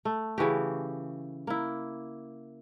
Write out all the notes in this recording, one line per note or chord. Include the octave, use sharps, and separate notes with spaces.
A3
C#3 E3 F#4 G4
A#3 E4